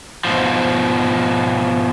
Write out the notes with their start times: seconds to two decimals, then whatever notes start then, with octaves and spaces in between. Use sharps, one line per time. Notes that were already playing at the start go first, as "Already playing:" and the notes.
0.25 G#2 B2 F3